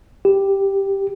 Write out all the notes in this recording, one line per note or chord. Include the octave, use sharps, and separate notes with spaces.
G4